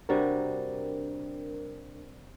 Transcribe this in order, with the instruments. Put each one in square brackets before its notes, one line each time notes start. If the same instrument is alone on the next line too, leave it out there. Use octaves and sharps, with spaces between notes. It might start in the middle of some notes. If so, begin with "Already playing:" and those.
[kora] C3 G3 F#4 [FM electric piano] D4 A#4